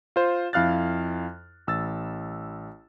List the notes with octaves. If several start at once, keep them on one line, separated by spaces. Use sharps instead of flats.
F4 C5
F2 E4 F5 F6 F#6 A6
A1 E6 A6